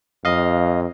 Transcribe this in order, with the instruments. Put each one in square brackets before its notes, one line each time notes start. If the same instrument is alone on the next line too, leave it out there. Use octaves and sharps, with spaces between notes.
[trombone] F2 [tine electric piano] D#5 F5